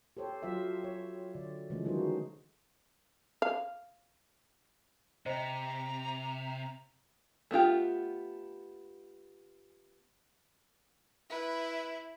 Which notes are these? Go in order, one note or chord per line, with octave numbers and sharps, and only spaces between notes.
G4 A4 C5 C#5
F#3 F4 C5 E5
C#5
D3 D5
C#3 E3 F3 G#3 A3
D3 D#3 F#3 D#4 F#4 C5
F5
C3 C5 D#5 A#5
A3 B3 F4 G4
E4 B4